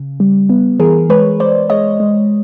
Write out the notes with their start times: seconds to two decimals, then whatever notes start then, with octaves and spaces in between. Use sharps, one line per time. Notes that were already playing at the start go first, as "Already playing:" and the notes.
Already playing: C#3
0.20 G3
0.49 B3
0.79 E3 G#4 A#4
1.09 G#3 B4 C#5
1.40 G#3 C5 D5
1.70 G#3 C#5 D#5
2.00 G#3